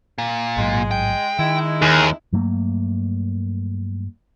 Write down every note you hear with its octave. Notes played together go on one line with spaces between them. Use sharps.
A#2
A1 G#2 F#3 G#3
G5
D#3 G#3 D#4 E4
D#2 G#4
G2 F#3 A3 A#3